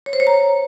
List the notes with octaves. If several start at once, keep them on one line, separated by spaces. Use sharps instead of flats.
C#5
C5
C#5
A#5